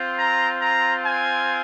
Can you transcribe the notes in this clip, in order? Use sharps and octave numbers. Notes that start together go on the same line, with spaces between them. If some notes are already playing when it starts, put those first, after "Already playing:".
Already playing: C4 F4
A#5
A#5
G#5